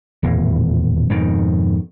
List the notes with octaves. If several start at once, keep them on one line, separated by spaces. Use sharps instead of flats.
D#1 E2 A2
F2 G#2 B2 D#3